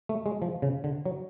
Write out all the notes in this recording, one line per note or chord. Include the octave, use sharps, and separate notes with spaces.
A3
G#3
F3
C#3
D3
F#3